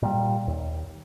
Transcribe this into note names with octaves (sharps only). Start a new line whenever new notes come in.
A#2 G3
D#2